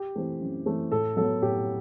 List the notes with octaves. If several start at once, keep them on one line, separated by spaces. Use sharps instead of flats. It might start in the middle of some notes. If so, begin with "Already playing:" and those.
Already playing: G4
E3 A3 C4
F#2
E3 A3 C4
A2 A4
F#3 B3 A4
A2 G4